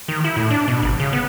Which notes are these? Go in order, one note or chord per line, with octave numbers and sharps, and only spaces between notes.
D#3
E4
A2
D4
B2
G#1
C#3
B3